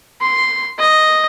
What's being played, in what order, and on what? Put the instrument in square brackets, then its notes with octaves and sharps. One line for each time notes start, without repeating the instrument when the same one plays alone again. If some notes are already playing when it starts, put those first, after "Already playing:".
[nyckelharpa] C6
D#5